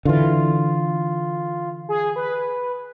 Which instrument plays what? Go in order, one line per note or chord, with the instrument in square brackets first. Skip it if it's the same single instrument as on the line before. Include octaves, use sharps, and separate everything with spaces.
[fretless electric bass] D3 E3 [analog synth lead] F4
[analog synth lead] G#4
B4